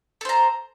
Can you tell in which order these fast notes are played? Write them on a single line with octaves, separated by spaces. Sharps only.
A4 C5 A#5